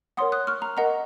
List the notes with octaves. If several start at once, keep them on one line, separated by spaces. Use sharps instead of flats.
A#4 C#5 F#5 C6 D#6
D#6 F#6
C#6 F6
A#5
A#4 D#5 F#5 A#5